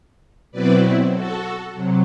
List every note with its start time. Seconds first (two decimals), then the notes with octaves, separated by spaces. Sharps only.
0.51 B2 F#3 C4 E4 B4 D5
1.13 F#4 A4
1.74 C3 F#3